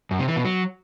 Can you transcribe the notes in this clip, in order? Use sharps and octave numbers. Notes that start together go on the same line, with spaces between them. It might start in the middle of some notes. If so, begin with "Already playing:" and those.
F#2
C3
E3
B2
F#3